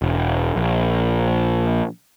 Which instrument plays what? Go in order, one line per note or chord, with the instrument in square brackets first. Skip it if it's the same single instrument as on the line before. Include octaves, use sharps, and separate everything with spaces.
[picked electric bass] E1
A#1